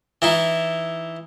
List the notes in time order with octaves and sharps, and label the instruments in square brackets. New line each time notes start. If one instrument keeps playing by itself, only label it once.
[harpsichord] E3 D#4 E4